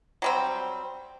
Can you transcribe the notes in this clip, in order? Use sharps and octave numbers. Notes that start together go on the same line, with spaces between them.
F#3 G3 C4